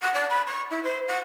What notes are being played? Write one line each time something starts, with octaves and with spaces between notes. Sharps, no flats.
F#5
D5
B5
C#6
E4
C5
F#5